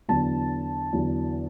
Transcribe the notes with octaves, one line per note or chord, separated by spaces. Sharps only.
E2 D3 F#3 B3 D4 A5
E2 D3 F#3 B3 D4